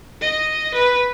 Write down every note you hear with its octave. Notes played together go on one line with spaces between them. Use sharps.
D#5
B4